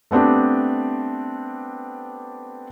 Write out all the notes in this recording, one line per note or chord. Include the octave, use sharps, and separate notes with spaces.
A3 B3 C4 D4 G4